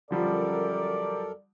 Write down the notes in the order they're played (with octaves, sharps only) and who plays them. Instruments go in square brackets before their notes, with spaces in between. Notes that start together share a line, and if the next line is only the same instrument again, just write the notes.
[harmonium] F#2 A4 A#4 [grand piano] D3 F3 G3 [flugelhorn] D5